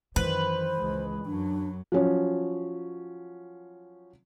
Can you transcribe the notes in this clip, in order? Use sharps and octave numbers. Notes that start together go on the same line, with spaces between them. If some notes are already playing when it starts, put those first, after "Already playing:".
F#2 D#3 E3 B4 C5
C#2 G#3
F#2 F#3 D4
F3 F#3 C#4